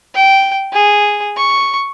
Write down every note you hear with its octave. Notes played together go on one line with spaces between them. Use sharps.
G5
G#4
C#6